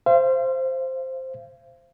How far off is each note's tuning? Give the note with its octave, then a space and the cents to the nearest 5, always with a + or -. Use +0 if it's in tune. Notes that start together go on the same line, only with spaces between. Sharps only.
C5 +0 F5 -40